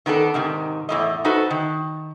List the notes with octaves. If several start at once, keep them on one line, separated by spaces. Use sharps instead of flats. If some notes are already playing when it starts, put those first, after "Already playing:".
D#3 B3 D4 A4
G#2 C3 D#3
E2 A2 D#5
D#4 F#4 A4 B4 C5
D#3